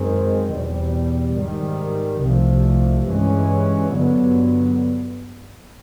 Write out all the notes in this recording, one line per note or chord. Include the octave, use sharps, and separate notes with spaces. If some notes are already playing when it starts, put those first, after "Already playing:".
Already playing: F#2 D#3 G#3 C4
E2 B2 G3
G#2 D#3 G3
C2 C3 F3 A3
G2 E3 G#3 C#4
G2 D3 F#3 B3